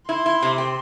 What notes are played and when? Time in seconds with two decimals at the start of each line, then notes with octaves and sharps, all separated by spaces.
0.09 E4 C6
0.26 E4
0.43 C3
0.58 C4